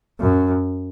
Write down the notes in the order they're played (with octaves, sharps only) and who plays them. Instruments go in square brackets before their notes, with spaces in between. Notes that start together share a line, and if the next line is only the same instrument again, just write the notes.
[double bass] F#2